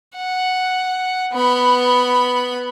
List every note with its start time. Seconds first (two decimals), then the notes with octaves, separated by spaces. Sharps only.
0.16 F#5
1.34 B3 B5